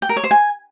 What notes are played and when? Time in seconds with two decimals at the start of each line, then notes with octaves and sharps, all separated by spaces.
0.02 G5
0.09 A#4
0.16 C#5
0.24 C5
0.31 G#5